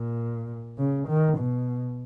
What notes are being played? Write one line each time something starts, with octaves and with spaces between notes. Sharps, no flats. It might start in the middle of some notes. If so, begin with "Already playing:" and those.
Already playing: A#2
C#3
D#3
B2